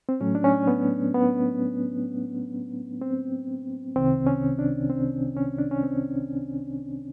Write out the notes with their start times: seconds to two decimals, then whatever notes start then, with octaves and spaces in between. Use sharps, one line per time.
0.09 C4
0.20 A2 F#3 A3 C#4
0.35 D4
0.44 C#4
0.67 B3
1.14 B3
3.01 C4
3.96 C2 C3 D#3 C4
4.27 C#4
4.59 D4
4.90 C4
5.37 C#4
5.58 D4
5.71 C#4
5.83 C4